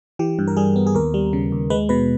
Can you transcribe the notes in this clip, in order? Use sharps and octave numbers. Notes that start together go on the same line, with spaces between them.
E3 G4
G2
A#4
G3 G#4
B3
G#4
D#2 A#4
G3
C#3
D#2
G#3 B4
B2 B4